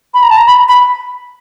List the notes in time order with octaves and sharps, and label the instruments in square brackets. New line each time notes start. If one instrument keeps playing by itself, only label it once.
[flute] B5
A#5
A5
A#5
B5
B5